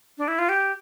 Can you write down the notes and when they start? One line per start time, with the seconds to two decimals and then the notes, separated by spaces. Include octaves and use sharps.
0.18 D4
0.28 E4
0.39 F4
0.49 G4